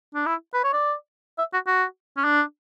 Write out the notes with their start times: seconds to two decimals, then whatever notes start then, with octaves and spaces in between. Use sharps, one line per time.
0.14 D4
0.26 E4
0.54 B4
0.64 C#5
0.73 D5
1.38 E5
1.53 F#4
1.67 F#4
2.17 C#4
2.24 D4